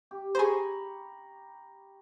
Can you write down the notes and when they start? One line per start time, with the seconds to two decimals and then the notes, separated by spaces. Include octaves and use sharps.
0.11 G4
0.35 G#4 C5 A#5 B5 C#6